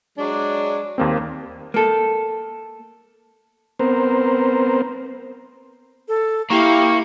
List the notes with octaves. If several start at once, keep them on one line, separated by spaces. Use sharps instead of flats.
F#3 G#3 D4
D#2 A#3 C4
A#3 A4
B3 C4 A#4 C5
A4
A#3 E4 G4 F5 C#6